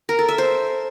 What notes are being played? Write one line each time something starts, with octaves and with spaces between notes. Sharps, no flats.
A#4
A4
E5
C5